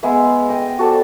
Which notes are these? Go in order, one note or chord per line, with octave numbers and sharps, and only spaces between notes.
G#3 B3 G#4 E5
D#5 G5
F#4 A4 C5 D5